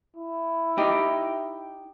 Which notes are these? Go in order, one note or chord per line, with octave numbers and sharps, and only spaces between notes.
E4
D#4 G4